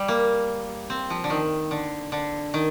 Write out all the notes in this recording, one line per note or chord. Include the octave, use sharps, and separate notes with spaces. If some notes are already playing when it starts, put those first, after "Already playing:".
Already playing: G3
A#3
C4
F3
D3
D#3
D3
D3
D#3